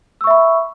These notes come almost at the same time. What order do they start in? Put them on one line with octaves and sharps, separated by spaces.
E6 C#6 E5 B5